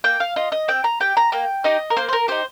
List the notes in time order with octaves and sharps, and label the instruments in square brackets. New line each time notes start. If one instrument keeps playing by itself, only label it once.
[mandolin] A#3 G5
F5
F4 D#5
D#5
C4 G5
A#5
G4 G5
A#5
A#3 G5
D#4 G4 D#5
A#4
A#3 C5
C5
A#4
D#4 G4 C5